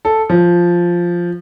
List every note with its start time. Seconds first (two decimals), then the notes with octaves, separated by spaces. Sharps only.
0.05 A4
0.30 F3